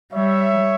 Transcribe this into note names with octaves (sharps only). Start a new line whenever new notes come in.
G3 C#5 E5